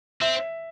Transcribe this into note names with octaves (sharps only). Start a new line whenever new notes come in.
C4 E5